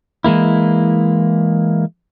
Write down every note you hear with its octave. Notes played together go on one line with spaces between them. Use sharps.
E3 G#3 A#3 E4